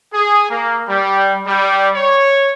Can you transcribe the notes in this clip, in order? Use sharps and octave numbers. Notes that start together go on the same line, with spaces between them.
G#4
A#3
G3
G3
C#5